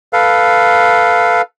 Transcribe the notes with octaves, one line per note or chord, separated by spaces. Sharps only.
A4 B4 F5